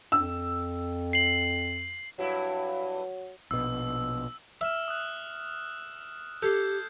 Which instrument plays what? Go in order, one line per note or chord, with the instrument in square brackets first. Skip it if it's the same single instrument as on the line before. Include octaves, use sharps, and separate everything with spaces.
[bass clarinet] F2 [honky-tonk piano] E6
[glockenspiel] C7 F#7
[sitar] G2 E4 [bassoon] F#3
[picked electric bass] A#1 B2 [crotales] E6
[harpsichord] E5 [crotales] E6 F6 E7
[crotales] D#6 F6 F#6
[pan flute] G4 [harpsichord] A4 [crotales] G6 G#6 C7